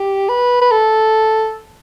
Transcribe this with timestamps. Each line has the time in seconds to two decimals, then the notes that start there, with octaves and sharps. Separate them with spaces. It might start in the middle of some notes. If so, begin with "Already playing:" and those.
Already playing: G4
0.29 B4
0.61 B4
0.71 A4